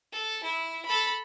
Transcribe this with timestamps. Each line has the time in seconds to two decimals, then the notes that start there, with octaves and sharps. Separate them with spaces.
0.12 A4
0.43 E4
0.85 A4 B5